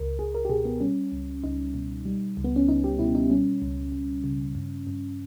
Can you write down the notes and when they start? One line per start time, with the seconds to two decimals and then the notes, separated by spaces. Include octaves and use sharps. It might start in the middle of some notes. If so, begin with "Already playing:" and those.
Already playing: C#2 A#4
0.19 C#2 G#4
0.35 A#4
0.45 G4
0.50 B2 G#4
0.65 B3
0.80 G3 C#4
1.12 C#2
1.43 C#2 D#4
1.74 B2
2.05 G3
2.37 C#2
2.44 B3
2.56 C#4
2.69 C#2 D#4
2.84 G4
2.99 B2 E4
3.15 D#4
3.30 G3 C#4
3.62 C#2
3.92 C#2
4.24 C#3
4.55 G2
4.87 G2